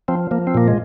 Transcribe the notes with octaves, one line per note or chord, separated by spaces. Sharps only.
F3 C4
F3 A#3
C4
A#2 A#3
G#3